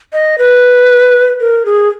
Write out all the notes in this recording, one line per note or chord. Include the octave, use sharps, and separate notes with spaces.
D#5
B4
A#4
G#4